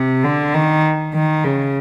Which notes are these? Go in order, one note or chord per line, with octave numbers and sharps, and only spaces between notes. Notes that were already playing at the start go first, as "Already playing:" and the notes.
Already playing: C3
D3
D#3
D#3
C#3